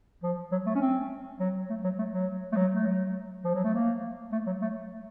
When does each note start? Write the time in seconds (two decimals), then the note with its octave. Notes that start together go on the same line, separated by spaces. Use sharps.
0.23 F3
0.52 F#3
0.66 A3
0.75 C#4
0.81 C4
1.40 F#3
1.70 A3
1.84 F#3
1.99 A3
2.13 F#3
2.52 A3
2.56 F#3
2.75 A3
2.86 F#3
3.45 F3
3.54 F#3
3.64 A3
3.74 A#3
4.32 A3
4.47 F#3
4.62 A3